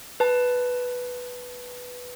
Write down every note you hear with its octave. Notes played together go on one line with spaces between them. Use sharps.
B4 A5